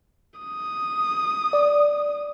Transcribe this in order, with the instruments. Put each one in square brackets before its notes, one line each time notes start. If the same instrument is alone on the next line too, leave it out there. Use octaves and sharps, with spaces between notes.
[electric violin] D#6
[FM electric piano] D5